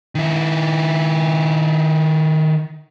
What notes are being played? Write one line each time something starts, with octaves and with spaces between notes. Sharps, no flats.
D#3 E4